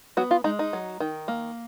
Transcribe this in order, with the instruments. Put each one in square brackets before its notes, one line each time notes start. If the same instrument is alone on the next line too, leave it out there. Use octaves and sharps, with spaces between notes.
[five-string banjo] F#3 B3 F#4
F4
G#3 D#4
D#4
F#3
D#3
A#3